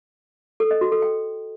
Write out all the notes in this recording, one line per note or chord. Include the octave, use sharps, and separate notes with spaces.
A4
D#5
F#4
A4
G5